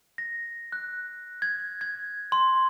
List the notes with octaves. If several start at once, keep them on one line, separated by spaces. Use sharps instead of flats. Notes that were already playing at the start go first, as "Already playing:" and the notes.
A#6
F#6
G#6
G#6
C6